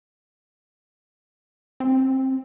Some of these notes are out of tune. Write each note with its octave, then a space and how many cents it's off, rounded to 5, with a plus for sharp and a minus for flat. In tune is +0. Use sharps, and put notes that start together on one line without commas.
C4 +20